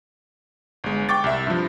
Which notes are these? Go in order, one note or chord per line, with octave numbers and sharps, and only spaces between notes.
G1 G#3
G5 C#6 D6 A6
C2 E5
G2 F3